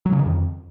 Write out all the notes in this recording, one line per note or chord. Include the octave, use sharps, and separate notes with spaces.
F#3
C#3
D#3
F2